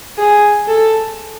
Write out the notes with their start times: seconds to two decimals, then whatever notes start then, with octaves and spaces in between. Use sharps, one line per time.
0.18 G#4
0.68 A4